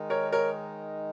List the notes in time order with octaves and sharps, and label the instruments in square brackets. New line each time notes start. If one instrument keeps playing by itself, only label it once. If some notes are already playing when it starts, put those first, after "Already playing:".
Already playing: [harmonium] D#3 G#3 D#4
[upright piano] A#4 C#5
A#4 C#5